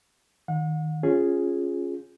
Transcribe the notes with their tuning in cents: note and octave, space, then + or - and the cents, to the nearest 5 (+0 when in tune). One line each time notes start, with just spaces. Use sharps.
D#3 +0 F#5 -40
C#4 +0 F4 +10 G#4 +0